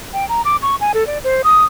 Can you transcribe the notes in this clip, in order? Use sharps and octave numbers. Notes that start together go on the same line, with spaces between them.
G5
A#5
D6
C#6
G#5
A4
D5
C5
D#6